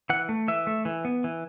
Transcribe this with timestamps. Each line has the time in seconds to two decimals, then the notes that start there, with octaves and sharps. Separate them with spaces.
0.10 E3 F#5
0.29 A3
0.48 E3 E5
0.67 A3
0.85 E3
1.05 B3
1.24 E3